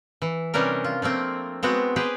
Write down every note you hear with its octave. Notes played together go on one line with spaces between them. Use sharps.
E3
C3 E3 G3 C#4 D4 A#4
F4
F3 A3 A#3 C4
G#3 B3 C4 F#4
G4 G#4 B4 C5